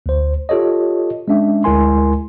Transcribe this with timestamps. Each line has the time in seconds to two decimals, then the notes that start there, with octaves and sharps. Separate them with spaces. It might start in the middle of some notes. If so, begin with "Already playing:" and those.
0.06 D2 C5
0.49 F4 G4 A4 C#5 D#5
1.28 G#3 C#4 D4 E5
1.64 D2 G#3 E4 A#4 G#5 C6